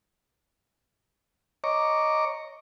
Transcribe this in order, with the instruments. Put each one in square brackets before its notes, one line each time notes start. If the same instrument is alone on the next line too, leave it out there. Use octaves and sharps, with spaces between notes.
[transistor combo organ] C#5 D#5 A#5 C#6 D6